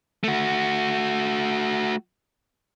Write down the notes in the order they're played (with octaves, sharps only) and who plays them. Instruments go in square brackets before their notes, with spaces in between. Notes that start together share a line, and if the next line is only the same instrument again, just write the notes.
[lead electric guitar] A3 F#4